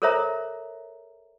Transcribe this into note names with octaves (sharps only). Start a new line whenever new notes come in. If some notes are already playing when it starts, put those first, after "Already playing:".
A4 A#4 C5 C#5 E5 A#5